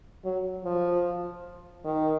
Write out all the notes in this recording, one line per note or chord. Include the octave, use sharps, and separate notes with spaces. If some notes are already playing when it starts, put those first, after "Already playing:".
F#3
F3
D#3